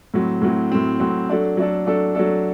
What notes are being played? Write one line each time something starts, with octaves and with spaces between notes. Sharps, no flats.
A2 F#3 C4
A2 F#3 C4
A2 F#3 C4
A2 F#3 C4
F#3 A3 D4 A4
F#3 A3 D4 A4
F#3 A3 D4 A4
F#3 A3 D4 A4